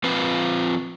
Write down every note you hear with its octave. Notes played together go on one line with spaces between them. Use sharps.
F3 C4 F4 B4